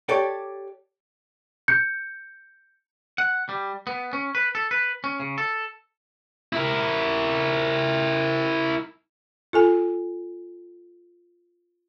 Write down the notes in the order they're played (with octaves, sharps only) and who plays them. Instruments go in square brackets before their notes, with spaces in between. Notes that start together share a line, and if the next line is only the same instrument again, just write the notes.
[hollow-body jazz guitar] G4 A4 C#5 D5 G5
[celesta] G6 C#7
[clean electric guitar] F#5
G3
B3
C#4
B4
A4
B4
C#4
C#3
A4
[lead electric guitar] E4 A#4
[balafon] F4 A4 G#5